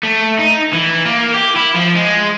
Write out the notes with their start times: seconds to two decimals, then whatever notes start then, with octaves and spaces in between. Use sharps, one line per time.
0.03 A3
0.39 D#4
0.73 E3
1.06 A#3
1.34 G4
1.56 E4
1.75 F3
1.95 G#3